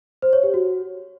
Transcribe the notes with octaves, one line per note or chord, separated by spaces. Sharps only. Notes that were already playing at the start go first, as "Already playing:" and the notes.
C5
C#5
G4
F#4